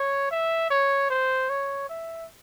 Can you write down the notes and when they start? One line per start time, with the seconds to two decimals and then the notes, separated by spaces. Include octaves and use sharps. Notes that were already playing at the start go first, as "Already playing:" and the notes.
Already playing: C#5
0.31 E5
0.70 C#5
1.10 C5
1.49 C#5
1.89 E5